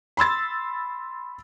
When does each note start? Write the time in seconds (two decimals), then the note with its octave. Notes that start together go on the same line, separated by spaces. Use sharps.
0.17 B5 C6 E6 A6